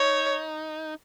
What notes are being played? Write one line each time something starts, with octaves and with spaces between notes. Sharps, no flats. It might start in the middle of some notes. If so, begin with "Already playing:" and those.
Already playing: D#4 C#5